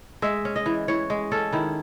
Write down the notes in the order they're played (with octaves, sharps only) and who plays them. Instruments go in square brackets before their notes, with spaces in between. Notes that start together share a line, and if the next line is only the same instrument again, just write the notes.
[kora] G#3 E5
C#4
D#5
E3
E3 C#5
G#3
C#4 A4
D#3 E4